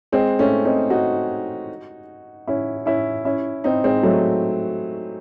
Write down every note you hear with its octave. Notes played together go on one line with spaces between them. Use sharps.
G#3 C4
A3 C#4
C4 D#4
D#4 F#4
C#4 E4
C#4 E4
C#4 E4
C4 D#4
G#3 C4
F#3 A3